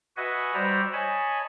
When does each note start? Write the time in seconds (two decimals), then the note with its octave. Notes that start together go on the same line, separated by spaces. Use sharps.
0.17 F#4 B4 D#5 E5 F#5 G#5
0.54 G3 F#4 C5 D5 E5 A#5
0.93 C#5 D#5 G#5 A5 B5